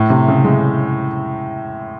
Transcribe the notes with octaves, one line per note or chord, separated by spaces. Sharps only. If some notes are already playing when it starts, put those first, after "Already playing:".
Already playing: A2
C3
C#3
G#3